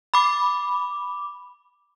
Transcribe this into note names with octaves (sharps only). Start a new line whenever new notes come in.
B5 D6